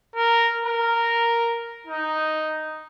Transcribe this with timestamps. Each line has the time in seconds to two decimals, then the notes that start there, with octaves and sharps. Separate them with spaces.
0.16 A#4
0.65 A#4
1.87 D#4